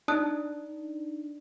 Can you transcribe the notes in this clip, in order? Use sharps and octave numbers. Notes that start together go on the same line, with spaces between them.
D4 D#4 A5 D#6 F#6